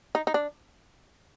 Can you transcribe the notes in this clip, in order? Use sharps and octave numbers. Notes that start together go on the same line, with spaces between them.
D#4
D#4
D4